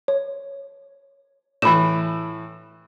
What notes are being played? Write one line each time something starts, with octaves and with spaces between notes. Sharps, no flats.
C#5
A2 E3 B5 E7